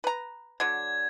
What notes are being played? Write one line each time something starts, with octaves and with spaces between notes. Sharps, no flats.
B4 A#5
D3 F#3 G#6